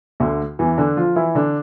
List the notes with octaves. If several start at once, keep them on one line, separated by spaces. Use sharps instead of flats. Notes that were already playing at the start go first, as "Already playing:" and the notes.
D2 D3
E2 E3
D3 D4
F3 F4
E3 E4
D3 D4